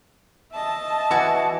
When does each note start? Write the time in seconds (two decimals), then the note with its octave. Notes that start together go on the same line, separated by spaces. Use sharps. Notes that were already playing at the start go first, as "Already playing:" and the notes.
0.52 D#5 E5 A5
1.11 E3 F#4 D5 G#5